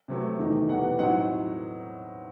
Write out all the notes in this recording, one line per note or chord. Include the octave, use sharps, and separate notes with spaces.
C3 F#3 A3
E2 D#3 A3 D#4
E2 B2 G3 F#5
A2 F#3 C4 D#4 F#5